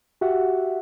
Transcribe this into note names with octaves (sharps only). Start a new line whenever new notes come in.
F#4 G4 E5 F#5